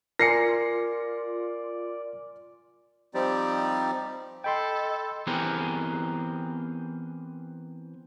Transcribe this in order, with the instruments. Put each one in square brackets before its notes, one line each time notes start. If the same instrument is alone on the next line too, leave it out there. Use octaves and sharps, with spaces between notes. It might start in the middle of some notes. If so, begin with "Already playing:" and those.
[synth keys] F4 [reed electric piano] A#4 G#5 [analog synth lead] D5 [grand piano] A#6 C7 C#7
[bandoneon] F3 G3 C4 D#4 G4 D5
[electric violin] A4 [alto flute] D#5 [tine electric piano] G5 B5 C6
[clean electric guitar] E3 B3 C4 G4 G#4 A#4